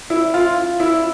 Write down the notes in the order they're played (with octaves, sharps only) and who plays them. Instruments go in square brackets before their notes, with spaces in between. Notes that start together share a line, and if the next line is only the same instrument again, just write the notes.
[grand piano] E4
F4
E4